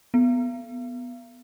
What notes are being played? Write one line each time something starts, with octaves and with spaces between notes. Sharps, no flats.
B3